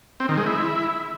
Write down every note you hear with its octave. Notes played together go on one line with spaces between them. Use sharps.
C4
D#3
G#3
E4